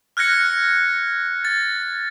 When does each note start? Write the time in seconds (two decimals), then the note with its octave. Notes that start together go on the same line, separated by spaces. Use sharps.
0.17 F6 F#6 G#6 A#6 C#7
1.45 A6